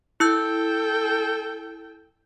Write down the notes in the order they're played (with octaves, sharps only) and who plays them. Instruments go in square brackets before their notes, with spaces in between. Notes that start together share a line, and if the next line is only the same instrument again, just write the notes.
[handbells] E4 E6 G6 [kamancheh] A4 G5